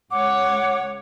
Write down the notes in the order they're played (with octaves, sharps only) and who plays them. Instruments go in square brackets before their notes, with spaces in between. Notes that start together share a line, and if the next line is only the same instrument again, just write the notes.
[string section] C#2 C#5 [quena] F#5 [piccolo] D6